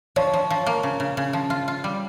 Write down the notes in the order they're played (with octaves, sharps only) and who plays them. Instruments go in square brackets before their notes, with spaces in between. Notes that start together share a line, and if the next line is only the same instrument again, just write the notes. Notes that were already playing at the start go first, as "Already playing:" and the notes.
[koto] F3 [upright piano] C#5
[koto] F3
F3
A#3
C#3
C#3
C#3
F3
F4
F4
G3